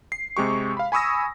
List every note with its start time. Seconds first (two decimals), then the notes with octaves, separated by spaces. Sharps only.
0.12 C7
0.37 C3 G#3 G4 C#6
0.77 F5 B5
0.92 G#5 B5 C#6 D#6 E6 A#6